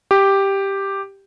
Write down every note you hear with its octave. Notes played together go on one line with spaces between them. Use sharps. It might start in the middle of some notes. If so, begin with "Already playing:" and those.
G4